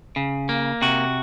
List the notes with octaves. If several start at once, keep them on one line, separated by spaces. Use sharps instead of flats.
C#3
A#3
C3 F#4